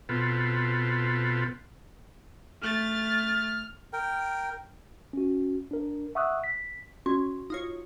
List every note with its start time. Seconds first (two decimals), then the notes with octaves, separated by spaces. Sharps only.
0.09 B2 B3 C4 F4 A4
2.62 A3 F6 A6
3.93 A#4 G5
5.13 C#4 F#4
5.71 D4 A#4
6.15 E5 F#5 C#6 D#6 E6 F#6
6.44 B6
7.06 C#4 F#4
7.50 D#4 F4 C#5